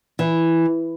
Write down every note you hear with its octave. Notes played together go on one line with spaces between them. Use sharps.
E3